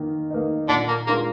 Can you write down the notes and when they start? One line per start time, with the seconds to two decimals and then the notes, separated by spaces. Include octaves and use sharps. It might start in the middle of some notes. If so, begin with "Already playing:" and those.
Already playing: D#3 A#3 D#4
0.30 A#3 D#4
0.68 A#2 D3 D4
0.88 A#3
1.07 G#3 A#3 D4 F4 A#4